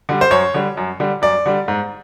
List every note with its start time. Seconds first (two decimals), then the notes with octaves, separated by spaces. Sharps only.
0.09 D3 G3
0.21 C5
0.31 F#2 C#5
0.54 D3 G3
0.77 F#2
1.00 D3 G3
1.22 F#2 D5
1.46 D3 G3
1.68 G#2